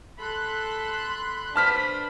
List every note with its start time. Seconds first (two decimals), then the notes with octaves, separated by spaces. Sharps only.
0.20 A4 B5 C6 F#6
1.56 D4 B4 C5 A5 B5 F6 B6